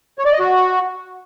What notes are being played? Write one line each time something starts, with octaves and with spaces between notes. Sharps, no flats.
C#5
D5
D#5
F#4